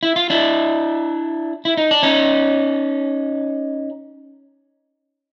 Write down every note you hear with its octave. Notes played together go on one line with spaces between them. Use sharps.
E4
F4
D4 E4
E4
D#4
D4
C#4 D#4